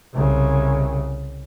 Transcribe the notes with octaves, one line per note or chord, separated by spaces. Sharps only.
C2 C#3